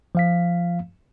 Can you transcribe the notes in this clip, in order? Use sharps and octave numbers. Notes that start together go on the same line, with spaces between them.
F3 F5 B6